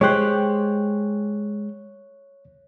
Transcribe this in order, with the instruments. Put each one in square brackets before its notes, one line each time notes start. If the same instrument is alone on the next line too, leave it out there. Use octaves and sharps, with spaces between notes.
[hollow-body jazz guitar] G#3 G4 C5 [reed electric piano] C#5 F#6